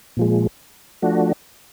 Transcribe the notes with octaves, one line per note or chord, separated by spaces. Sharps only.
A#2 F3 G#3
F3 A3 D4 F#4